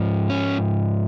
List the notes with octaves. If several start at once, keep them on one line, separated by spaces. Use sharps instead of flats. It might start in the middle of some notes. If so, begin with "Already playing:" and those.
Already playing: G#2 F3
C#4